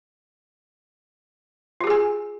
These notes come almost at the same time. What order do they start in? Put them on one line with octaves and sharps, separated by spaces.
F4 G4 G#4 G#5